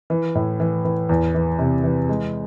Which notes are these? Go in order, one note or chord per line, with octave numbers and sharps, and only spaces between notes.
E3
A2
E3
E3
E2
E3
C3
E3
G#3